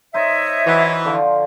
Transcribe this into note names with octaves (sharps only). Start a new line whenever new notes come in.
D#4 C5 C#5 D#5 E5
E3 F#4
D3 F3 F4